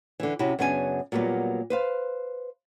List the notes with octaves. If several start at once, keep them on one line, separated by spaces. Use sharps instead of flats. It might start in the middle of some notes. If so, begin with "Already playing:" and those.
D3 E3
C3 C#4 E4 F#4
F#2 C#3 B3 D4 F4 G#5
A#2 F#3 G3 A#3 B3
B4 C5 F5